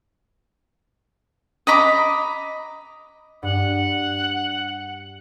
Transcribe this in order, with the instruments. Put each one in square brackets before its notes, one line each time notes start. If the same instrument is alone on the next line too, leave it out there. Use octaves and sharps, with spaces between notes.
[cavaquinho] D#5 A#5 B5 D6
[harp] G2 [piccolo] F#5